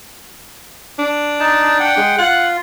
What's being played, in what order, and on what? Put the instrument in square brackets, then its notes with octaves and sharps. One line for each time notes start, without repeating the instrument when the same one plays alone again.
[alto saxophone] D4
[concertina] D#4 A5
F#5 G5
[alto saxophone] G#3
[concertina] F4 [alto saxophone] F#5